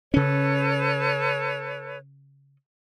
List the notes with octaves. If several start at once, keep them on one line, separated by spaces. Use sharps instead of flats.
C#3 C#4 A4 B4 C#5